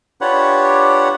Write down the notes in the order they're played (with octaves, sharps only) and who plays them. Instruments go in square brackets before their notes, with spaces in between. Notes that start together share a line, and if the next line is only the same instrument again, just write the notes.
[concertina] D4 F4 G4 B4 C#5 F#5